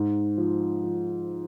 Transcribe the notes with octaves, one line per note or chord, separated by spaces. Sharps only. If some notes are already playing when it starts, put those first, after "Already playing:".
Already playing: G#2
F3
F3